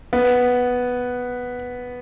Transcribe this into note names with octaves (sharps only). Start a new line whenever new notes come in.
B3